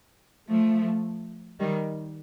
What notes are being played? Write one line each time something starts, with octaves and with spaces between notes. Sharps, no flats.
F3 A3
D#3 G3